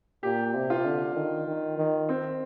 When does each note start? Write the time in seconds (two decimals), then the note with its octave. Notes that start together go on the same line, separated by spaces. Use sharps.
0.23 A#2 G4
0.55 C3
0.70 F4
0.85 D3
1.16 D#3
1.47 D#3
1.78 D#3
2.09 C4